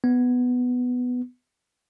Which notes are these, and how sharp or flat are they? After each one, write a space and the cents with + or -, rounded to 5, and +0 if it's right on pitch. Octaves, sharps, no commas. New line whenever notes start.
B3 +5